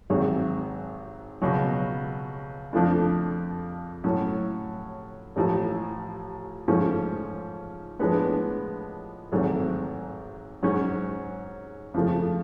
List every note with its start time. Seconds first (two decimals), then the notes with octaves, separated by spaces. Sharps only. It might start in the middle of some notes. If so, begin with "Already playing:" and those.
0.10 G#1 G#2 F#3
1.41 C#2 B2 F#3
2.73 F2 F3 A3 D4
4.04 A2 F#3 C#4
5.36 A1 A2 F3
6.68 G#2 F3 A3 C#4
7.99 A2 F3 G#3 B3 D4
9.31 G#1 G#2 F#3 A3
10.63 G#2 F#3 C#4
11.94 F2 C#3 F3 A3